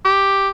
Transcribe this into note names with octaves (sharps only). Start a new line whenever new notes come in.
G4